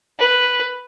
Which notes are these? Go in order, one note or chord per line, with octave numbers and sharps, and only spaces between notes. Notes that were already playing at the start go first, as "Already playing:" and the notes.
B4